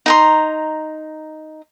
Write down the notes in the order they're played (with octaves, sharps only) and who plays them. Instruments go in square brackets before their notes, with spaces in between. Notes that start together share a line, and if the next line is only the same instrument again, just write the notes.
[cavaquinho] D#4 A#5 C6